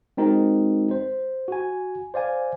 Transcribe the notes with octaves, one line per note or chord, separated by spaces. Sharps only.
G#3 C4 D#4 F#4 A#4
C5
F#4 G#5
C5 D5 F5 G#5